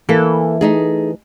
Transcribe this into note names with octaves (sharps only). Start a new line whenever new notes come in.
E3 A#3 A4
A3 D#4 G#4